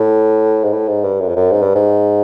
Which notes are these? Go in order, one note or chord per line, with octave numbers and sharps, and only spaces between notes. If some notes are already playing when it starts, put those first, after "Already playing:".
Already playing: A2
G#2
A2
G#2
G2
F#2
F2
F#2
G#2
G2
G#2